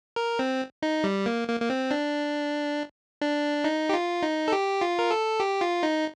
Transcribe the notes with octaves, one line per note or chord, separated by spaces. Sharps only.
A#4
C4
D#4
G3
A#3
A#3
A#3
C4
D4
D4
D#4
G4
F4
D#4
A4
G4
F4
A#4
A4
G4
F4
D#4